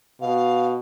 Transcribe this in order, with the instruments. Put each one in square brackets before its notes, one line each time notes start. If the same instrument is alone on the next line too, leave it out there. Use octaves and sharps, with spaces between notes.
[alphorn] B2 [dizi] F5